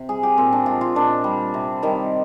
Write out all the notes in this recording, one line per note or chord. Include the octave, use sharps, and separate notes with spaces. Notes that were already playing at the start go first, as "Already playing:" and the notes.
Already playing: C3
G3 G#4
G4
A#2 C4
D4
F3 G#3 F4
F4
A#2 D4
G3
C3
D#3 G3